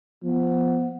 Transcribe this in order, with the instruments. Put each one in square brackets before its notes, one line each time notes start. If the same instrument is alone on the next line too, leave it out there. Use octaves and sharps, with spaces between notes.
[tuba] F3 [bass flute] B3